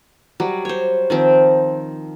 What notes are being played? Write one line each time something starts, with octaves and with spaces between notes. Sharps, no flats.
F#3 G3
C5 C#5
D#3 F3 C4